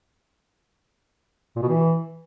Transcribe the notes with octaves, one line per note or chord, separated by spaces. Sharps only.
A#2
B2
E3